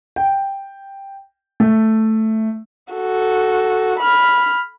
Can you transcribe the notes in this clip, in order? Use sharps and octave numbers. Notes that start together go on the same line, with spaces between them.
G5
A3
F#4 A4
B5 F6